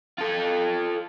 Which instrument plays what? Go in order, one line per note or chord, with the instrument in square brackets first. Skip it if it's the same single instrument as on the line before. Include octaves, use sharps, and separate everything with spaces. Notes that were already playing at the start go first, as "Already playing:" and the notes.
[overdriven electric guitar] F4 A4